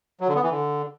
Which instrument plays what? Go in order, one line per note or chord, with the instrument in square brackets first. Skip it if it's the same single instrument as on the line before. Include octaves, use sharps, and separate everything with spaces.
[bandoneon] F#3
D3
B3
E3
D3